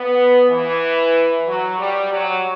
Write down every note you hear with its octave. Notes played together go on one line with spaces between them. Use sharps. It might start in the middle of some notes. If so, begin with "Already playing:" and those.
Already playing: B3
E3
F#3
G3
F#3